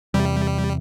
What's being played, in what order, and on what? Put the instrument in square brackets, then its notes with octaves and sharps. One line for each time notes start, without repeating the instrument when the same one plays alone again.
[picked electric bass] E2 C3 [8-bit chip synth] G3